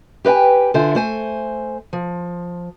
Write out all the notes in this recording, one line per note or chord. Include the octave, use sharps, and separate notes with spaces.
G4 B4 D#5 G5 G#5
D3 F4 C5 E5 G#5
A3 C5 G#5
F3